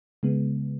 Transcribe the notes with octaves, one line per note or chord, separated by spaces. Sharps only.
C#3 G#3 B3